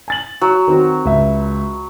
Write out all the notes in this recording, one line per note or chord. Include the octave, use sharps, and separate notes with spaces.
G#5 A6 F#7
F#3
D#3 C4 F#4
C#2 E5